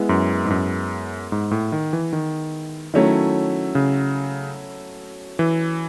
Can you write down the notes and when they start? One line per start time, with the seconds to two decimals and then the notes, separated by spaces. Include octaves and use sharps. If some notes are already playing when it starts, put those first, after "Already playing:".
Already playing: G#3 B3 E4
0.09 F#2
0.46 G#2
0.50 F#2
1.32 G#2
1.51 A2
1.72 D#3
1.93 E3
2.13 D#3
2.94 D#3 F#3 A3 C#4 E4
3.75 C#3
5.39 E3